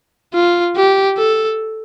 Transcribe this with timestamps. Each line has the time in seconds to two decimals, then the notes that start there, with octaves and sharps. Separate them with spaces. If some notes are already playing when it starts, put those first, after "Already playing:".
0.34 F4
0.76 G4
1.18 A4